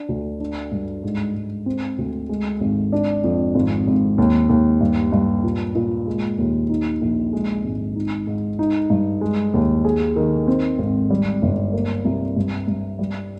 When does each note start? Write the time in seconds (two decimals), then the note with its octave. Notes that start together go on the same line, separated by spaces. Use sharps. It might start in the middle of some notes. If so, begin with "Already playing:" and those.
Already playing: D4
0.09 D2
0.40 D4
0.72 G2
1.03 G#2
1.35 G#2
1.66 C4
1.98 D2
2.29 G#3
2.60 G#1
2.92 D4
3.24 F2
3.55 G#1
3.87 G#1
4.18 D#2
4.49 D#2
4.81 G2
5.13 G2
5.43 A#2
5.75 A#2
6.07 G#3
6.38 D#2
6.70 D#4
7.01 A#1
7.33 G#3
7.64 G#1
7.96 D#4
8.27 G#2
8.59 D#4
8.90 G2
9.21 G#3
9.54 D#2
9.85 G#4
10.16 D#3
10.48 C4
10.78 G#1
11.10 G3
11.42 G1
11.73 A#3
12.05 C2
12.36 G2
12.68 G2
12.99 G3